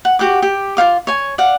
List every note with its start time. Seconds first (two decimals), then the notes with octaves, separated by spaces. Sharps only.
0.05 F#5
0.19 F#4 G4 F#5 D6
0.42 G4
0.77 F4 C#5 F5 D6
1.07 C#5 G#5
1.38 D5 F5 F#5